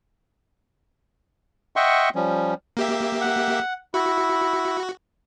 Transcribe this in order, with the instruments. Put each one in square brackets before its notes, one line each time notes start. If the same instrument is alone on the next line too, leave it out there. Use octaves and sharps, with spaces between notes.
[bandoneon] D#5 E5 F#5 G5 C6 C#6
F3 G3 C#4
[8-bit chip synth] A#3 G4 E5
[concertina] F#5
[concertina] E4 [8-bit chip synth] F#4